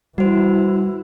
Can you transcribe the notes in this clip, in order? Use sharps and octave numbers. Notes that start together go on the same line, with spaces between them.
E3 G3 E4 F#4 C5